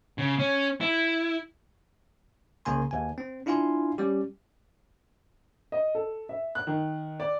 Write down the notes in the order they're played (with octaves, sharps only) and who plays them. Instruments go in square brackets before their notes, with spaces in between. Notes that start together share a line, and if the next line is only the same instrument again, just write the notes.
[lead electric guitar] C#3
C#4
E4
[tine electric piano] C2 C#3 A#3 G#5 C6
D#2 G#5
C4
D4 E4 F4 F5 G#5 C6
G3 C#4 G4
[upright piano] D#5
A4
E5
F#6
D#3
D5